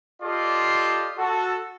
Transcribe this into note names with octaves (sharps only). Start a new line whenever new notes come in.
F4 G4 A4 D5 D#5 C6
F#4 A4